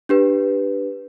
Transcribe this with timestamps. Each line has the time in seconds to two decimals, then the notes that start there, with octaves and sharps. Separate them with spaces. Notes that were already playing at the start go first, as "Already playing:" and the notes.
0.09 D4 G4 B4